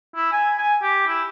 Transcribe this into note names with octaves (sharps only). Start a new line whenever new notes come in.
E4
G#5
G#5
G4
E4